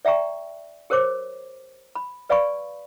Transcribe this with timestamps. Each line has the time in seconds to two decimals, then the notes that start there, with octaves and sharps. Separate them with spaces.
0.05 D5 E5 G5 A#5 C#6
0.90 G4 A#4 C5 C#5 D6
1.95 B5
2.29 B4 D5 F5 G#5 B5 C#6